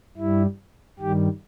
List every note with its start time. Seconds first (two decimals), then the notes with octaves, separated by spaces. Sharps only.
0.17 G2 G3 E4
1.00 G2 D#3 G3 G4